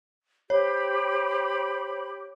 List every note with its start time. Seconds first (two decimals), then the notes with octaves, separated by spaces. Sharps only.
0.50 G4 C5 C#5 B5